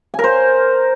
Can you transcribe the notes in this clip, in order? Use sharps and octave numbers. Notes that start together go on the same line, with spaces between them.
G#5
A#4
C5